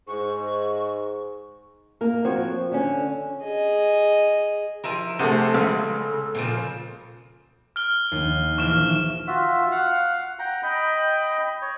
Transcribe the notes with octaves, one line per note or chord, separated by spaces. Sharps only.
G#2 C#6
A#3 A#4
F3 C4 F#4 C#5
D3 C#4
G#4 D#5
F3 E4 A#4
C3 A3 G#4 A4 F#5
C#2 C#3 A4
A#2 C#3 F3
F6 G7
D#2
A#1 E3 C#6 F6 E7
F4 F#4 E5
F5 F#5
F#5 G5 A#5
D#5 G5 B5
C#5